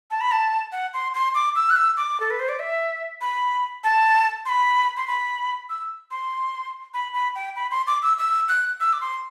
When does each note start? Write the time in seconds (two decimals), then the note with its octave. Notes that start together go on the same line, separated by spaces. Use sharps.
0.11 A5
0.21 B5
0.32 A5
0.72 F#5
0.94 C6
1.14 C6
1.35 D6
1.55 E6
1.70 F#6
1.76 E6
1.97 D6
2.20 A4
2.30 B4
2.40 C5
2.49 D5
2.59 E5
3.21 B5
3.84 A5
4.45 C6
4.49 B5
4.97 C6
5.08 B5
5.69 E6
6.11 C6
6.94 B5
7.14 B5
7.35 G5
7.56 B5
7.71 C6
7.87 D6
8.02 E6
8.19 E6
8.49 F#6
8.80 E6
8.93 D6
9.01 C6